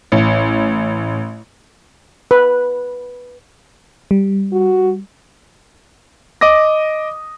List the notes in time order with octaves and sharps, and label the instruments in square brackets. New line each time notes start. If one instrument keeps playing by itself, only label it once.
[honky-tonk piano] A1
[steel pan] B4
[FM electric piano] G3
[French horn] F#4
[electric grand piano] D#5 D6 D#6 A#6